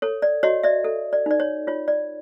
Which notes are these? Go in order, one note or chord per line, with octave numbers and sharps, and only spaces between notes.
A4 C#5
D5
F#4 C#5 D#5
D5 E5
A4
D5
D#4 D5
C#5
F4 C#5
D5